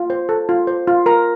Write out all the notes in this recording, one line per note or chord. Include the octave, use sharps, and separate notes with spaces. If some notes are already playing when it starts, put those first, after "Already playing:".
Already playing: F4
C5
A4
F4
C5
F4
A#4 A#5